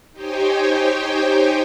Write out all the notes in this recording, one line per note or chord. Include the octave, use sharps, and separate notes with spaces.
D#4 G4 C5 C#5 G5 G#5